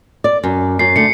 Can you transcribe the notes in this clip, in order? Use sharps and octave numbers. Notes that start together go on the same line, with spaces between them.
D5
F#2
F#2 C7
D3 A3 C#7